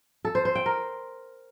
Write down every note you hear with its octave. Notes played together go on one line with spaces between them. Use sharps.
A4
C5
C5
G5
A#4